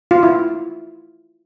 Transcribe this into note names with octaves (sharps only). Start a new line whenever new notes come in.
F4
E4